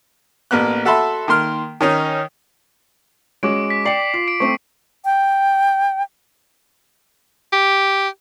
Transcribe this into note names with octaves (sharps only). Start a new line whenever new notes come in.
A1 A#3 B3 F#6
F#4 A4 E5 A5 B5 C6
D#3 A#3 C6 F6
D#3 C#4 D#4
G#3 C#4 F#4 D6 D7
B6
D5 G5 C7 C#7 F#7
F4
D7
A3 C4 C#6
G5
G4